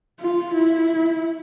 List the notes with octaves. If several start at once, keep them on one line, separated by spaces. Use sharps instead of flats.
F4
E4